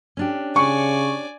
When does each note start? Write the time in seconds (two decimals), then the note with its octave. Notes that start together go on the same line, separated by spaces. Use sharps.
0.17 C#4 D4 G4
0.56 C#3 D5 G#5 C#6